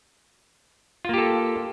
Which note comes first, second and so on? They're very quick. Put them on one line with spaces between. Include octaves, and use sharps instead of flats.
F4 A#3 G4 A4